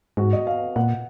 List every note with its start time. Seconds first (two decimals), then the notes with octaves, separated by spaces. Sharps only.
0.17 G#2 F#4
0.33 D#5
0.47 F5
0.76 A#2 F#5